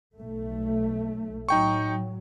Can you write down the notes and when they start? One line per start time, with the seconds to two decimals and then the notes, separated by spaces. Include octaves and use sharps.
0.17 B1 A3
1.49 A2 F#3 D#4 G5 C#6